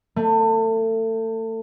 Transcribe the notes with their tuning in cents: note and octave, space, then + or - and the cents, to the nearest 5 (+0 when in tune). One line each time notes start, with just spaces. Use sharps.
A3 +30